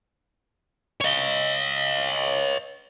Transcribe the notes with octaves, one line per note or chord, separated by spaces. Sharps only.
C#5 D#5